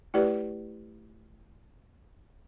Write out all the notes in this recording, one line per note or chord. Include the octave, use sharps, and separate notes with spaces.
A3 E4 G4 B4 D5